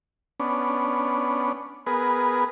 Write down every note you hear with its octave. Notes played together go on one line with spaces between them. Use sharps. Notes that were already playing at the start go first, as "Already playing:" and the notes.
B3 C#4 D4
B3 G#4 A#4 B4